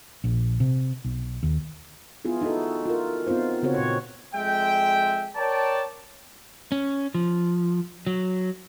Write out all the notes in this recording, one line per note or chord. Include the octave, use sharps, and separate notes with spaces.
A#1
C3
B1
D#2
B3 E4 F4 G#4
D#4 E4 F#4 A4
F4 A#4
B3 C4 D#4 F4 C5
C#3 B3 C4 F#4 C5 C#5
A#2 C#5
F2 G#3 E5 G5
A#4 C#5 D5 G5 A5
C#4
F3
F#3